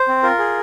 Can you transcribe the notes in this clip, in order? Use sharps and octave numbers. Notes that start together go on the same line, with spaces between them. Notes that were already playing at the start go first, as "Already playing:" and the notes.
Already playing: C5
C4
F4 A#4
G#4